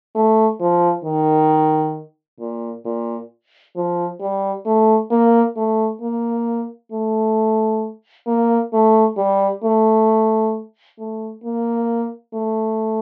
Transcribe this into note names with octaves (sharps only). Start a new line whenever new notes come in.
A3
F3
D#3
A#2
A#2
F3
G3
A3
A#3
A3
A#3
A3
A#3
A3
G3
A3
A3
A#3
A3